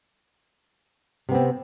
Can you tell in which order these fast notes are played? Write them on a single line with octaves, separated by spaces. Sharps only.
C3 B3 C4